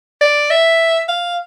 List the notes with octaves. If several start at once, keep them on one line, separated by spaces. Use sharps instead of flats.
D5
E5
F5